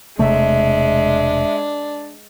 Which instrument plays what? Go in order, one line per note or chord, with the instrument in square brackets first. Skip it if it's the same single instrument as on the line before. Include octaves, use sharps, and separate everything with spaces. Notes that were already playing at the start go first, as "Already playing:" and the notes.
[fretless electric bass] E1 C3 A3 [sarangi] G#3 [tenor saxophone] D4 [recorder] E5